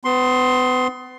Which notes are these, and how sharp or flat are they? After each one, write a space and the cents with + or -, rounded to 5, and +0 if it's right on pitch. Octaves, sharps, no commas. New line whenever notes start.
B3 +35 C6 +5